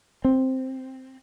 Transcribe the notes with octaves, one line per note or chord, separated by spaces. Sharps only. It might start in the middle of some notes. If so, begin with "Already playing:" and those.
C4